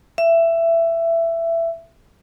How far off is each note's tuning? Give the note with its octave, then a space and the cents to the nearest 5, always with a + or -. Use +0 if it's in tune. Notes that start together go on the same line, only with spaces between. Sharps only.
E5 +15